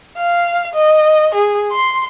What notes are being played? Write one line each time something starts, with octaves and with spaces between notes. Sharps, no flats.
F5
D#5
G#4
C6